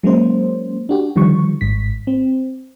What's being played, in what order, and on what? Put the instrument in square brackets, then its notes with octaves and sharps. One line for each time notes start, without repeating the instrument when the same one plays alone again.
[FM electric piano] F#3 G#3 A#3 C#4 C5
D4 F#4 G4
D3 D#3 F3 G3 C#6
G#1 G#2 B6
C4